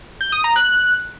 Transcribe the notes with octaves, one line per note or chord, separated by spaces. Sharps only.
G6
D#6
A#5
F#6